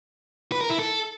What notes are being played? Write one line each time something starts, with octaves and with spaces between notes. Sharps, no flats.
B4
A#4
E4
A4